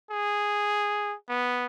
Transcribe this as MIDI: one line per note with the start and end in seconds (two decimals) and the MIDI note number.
0.11 1.15 68
1.29 1.66 59